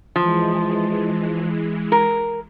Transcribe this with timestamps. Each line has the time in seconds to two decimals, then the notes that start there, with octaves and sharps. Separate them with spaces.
0.16 E3 F3 G#3
1.92 A#4